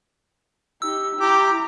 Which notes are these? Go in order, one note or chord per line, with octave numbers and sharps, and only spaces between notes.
D#4 G4 E6
E4 G4 A#5 D6